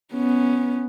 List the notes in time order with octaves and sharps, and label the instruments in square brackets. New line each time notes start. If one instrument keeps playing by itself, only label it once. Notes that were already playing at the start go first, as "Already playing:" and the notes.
[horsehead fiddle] B3 C#4